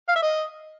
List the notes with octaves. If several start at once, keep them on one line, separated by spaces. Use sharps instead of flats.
F5
E5
D#5